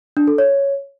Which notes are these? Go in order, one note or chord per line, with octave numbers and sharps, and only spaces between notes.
D4
A4
C#5